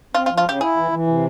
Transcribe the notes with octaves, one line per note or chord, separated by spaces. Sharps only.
C4 F4
F4
F3
F4
C#3 G4
E4 G#4
E3
E3
C3